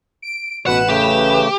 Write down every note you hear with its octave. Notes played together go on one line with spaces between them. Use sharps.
D7
A1 B2 B4 F#5 E7
C#3 A3 G4